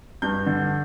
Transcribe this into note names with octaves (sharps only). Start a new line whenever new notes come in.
G2 G6
D3